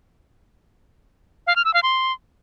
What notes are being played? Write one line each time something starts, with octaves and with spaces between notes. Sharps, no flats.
F5
F6
E6
F5
C6